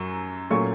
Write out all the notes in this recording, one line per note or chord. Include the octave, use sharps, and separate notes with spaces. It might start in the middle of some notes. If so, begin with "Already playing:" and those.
Already playing: F#2 F#3 C#6
A#2 F#3 A3 C#4 C#6